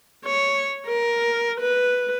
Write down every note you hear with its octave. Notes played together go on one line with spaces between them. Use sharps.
C#5
A#4
B4